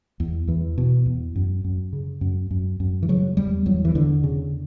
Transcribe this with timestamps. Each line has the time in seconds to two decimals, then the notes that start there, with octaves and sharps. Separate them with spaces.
0.20 E2
0.48 E2 E3
0.78 B2
1.06 E2
1.36 F#2
1.64 F#2
1.93 C#3
2.21 F#2
2.51 F#2
2.80 F#2
3.03 E3
3.09 C#3 F#3
3.37 E2 G3
3.66 E2 F#3
3.85 E3
3.95 E2 D3
4.24 C#3